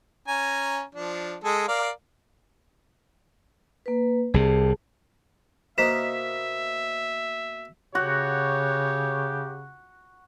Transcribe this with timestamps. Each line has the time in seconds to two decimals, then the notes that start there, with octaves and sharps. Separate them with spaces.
0.28 C#4 G#5 A#5
0.95 F3 D4
1.44 G#3 G#4 A4
1.68 A#4 D5 F5
3.86 A#3 B4
4.34 C2 C3 G#4 A5
5.78 B2 A#3 D#4 C5 E5 B6 E7
7.95 C#3 F#4 G4 C#5